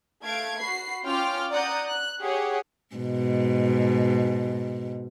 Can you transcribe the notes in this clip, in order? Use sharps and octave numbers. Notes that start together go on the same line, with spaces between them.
A3 F5 G#6 D7
F#4 B5 C7
C#4 F4 G5 C6 D6 F6
D5 F#5 A#5 D#6 F#6 G6
F#6
G4 G#4 C#5 F#5
G#2 B2